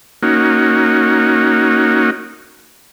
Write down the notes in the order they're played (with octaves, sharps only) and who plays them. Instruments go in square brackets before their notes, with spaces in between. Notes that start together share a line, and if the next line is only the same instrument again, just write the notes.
[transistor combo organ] A#3 C#4 D#4 F#4